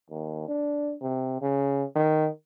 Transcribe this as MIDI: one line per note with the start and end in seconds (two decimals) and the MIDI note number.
0.11 0.44 39
0.48 0.95 62
1.01 1.38 48
1.42 1.84 49
1.96 2.29 51